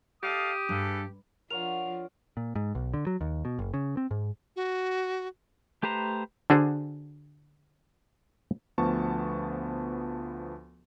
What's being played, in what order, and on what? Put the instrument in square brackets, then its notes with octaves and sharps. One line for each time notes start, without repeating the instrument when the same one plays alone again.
[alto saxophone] G4 [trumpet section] A4 D#5 F5 [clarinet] D#6
[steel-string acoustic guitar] G2 [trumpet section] G#4 A4 B4
[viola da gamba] F3 D4 F4 [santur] A#4 C#5 F#5 [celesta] F7
[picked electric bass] A#2
G#2
B1
D3
F#3
D#2
B2
F#1
C#3
C4
G#2
[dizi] F#4
[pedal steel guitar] A3 G4 B4 C5 A#5
[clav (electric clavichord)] D3 D4 F#4 G#4 C5
[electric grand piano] D2 F3 B3 A5 C#6